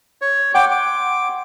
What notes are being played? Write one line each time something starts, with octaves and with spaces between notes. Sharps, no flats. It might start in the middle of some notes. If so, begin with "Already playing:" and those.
C#5
F#5 G5 C6 D6
D6